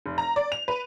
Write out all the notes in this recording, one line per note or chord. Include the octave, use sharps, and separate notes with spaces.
F1
A#5
D5
F7
B4